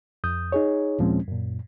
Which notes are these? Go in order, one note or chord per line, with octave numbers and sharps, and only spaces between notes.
F2 D#6 G6
D#4 G#4 C#5
D#2 A#2 F3 G#3 C4 C#4
F#2 A#2